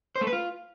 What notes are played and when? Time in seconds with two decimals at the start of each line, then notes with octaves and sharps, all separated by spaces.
0.16 C5
0.21 A3
0.27 B4
0.33 F4